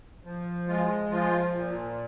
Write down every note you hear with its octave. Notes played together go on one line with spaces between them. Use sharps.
F3
G#3 F4
F3 F4
A#2